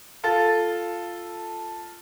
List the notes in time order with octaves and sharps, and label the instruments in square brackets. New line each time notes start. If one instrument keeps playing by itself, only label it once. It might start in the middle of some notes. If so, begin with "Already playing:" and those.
[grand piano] F4 A4 A6